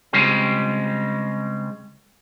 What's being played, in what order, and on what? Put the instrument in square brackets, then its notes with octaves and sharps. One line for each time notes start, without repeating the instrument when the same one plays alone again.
[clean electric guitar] C#3 G3 G#3 C4